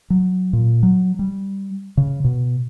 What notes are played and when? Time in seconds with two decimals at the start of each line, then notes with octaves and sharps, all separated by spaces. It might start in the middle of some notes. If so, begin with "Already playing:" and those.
0.10 F#3
0.53 A#2
0.83 F#3
1.19 G3
1.97 C#3
2.24 B2